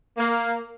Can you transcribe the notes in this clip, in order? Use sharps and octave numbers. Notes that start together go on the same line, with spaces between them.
A#3